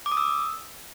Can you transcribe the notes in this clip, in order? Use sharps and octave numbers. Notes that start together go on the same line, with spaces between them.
D6
D#6
E6